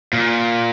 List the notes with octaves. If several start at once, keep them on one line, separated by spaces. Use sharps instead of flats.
A#2